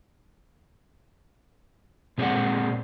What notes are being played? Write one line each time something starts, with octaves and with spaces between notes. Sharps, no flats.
A#2 G#3 C4 G4 D5 F#5